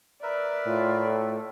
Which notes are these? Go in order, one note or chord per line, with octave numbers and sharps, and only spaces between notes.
A#4 B4 D5 E5
A2 F4
A4